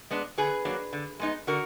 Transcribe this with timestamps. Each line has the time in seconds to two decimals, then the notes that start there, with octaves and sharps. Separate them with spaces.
0.11 G#3 B3 D4
0.38 D3 G#4 B4
0.65 F#3 A#3 D4
0.93 D3
1.20 G#3 B3 D#4
1.47 D3 F#4 A#4